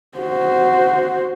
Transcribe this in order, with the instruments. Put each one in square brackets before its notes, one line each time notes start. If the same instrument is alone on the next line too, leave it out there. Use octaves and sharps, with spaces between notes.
[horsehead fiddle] F#4 C5